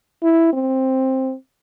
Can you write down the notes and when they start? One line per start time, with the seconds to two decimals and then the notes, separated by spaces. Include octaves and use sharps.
0.23 E4
0.53 C4